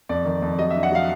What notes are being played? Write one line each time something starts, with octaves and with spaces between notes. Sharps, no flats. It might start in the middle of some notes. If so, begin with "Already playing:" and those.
F2 D5
D#3
F2
F#3 D#5
E5
D4
F#5
F#3 F5